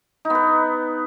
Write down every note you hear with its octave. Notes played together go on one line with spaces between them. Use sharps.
D#4
B3
B4